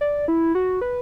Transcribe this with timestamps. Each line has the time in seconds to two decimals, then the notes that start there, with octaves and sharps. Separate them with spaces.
0.01 D5
0.28 E4
0.55 F#4
0.81 B4